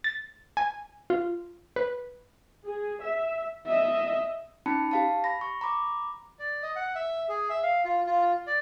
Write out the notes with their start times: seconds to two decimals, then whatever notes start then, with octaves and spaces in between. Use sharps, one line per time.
0.04 A6
0.57 G#5
1.10 F4
1.76 B4
2.65 G#4
3.03 E5
3.67 D#5 E5
4.66 C#4 D#4 A5 B5 C#7
4.91 G4 F5 A5
5.24 B5 A#6
5.41 C#6
5.61 A#5 B5 D6
6.39 D5
6.63 D#5
6.76 F#5
6.95 E5
7.29 G#4
7.50 E5
7.63 F5
7.85 F4
8.06 F4
8.47 D5